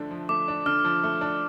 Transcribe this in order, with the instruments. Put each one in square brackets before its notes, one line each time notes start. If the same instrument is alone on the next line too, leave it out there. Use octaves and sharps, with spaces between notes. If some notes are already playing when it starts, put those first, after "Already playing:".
Already playing: [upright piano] D3 F3 A3 D4
F3
[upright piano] A3 [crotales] D6
[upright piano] D4
[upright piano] D3 [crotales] F6
[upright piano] F3
A3
D4